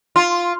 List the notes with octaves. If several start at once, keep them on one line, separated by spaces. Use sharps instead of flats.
F4